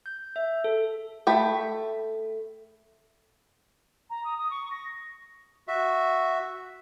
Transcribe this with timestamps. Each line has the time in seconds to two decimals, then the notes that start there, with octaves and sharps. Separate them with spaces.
0.06 G6
0.36 E5
0.64 A4
1.27 A3 G5 B5
4.10 A#5
4.24 D#6
4.38 D#6
4.51 C#6
4.71 A#6
5.68 F#4 E5